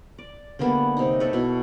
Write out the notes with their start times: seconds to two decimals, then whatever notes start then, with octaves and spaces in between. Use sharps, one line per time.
0.18 D5
0.59 D3 G3 A#3 B3
0.97 C3 D#4
1.20 A4 B4 C#5
1.33 B2 E4